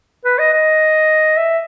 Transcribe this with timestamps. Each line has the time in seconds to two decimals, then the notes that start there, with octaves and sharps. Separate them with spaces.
0.25 B4
0.39 D#5
0.53 D#5
1.37 E5